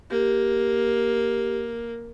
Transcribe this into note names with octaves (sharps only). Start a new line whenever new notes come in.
A#3 G4